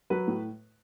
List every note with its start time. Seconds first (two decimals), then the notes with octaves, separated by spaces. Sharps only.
0.10 F#3 B4
0.28 A2